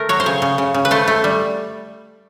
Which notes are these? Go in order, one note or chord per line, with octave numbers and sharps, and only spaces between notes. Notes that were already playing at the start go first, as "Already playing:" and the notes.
Already playing: A3 A#4
F#3 C#5
C5
C#3 C#5
C#3
C#3
C#3
B4
A3 C5
A3
G3